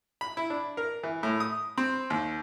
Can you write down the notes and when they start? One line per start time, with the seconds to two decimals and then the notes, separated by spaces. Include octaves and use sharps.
0.21 B5
0.37 E4
0.50 D4
0.77 A#4
1.04 E3
1.23 A2
1.40 D#6
1.78 C4
2.10 D#2